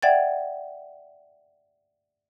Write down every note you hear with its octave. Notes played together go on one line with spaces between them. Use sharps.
D5 E5 F#5 G5 G#6 A6